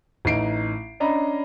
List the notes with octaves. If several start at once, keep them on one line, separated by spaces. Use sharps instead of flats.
A1 D#4 C7 D7
C#4 D4 D#5 A#5 B5